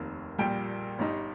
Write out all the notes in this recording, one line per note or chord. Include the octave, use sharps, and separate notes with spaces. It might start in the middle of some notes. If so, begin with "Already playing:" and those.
Already playing: F1 D#2 D#3 A#3 D#4
A#1 A#2 G3 G5
G1 G2 G3 D#4